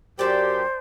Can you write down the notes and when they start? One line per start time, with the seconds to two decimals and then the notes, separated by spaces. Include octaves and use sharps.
0.19 F#2 G4 C5 D5 A5